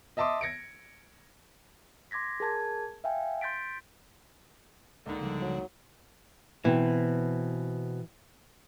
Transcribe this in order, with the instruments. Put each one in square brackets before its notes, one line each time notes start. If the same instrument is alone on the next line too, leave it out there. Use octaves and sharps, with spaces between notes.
[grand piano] D#5 E5 A5 C6 D6 D#6
G#6 A#6 C#7 D7
[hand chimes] C6 D6 G#6 A#6 B6
G#4 A#4 A5 G#6
E5 F5 G5 G#5
C6 G6 A6 B6 D7
[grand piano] C#2 A#3 D#4 [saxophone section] D3
[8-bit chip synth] C#3 F3 G3
[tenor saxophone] F#3
[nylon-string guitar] B2 C4 [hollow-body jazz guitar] E3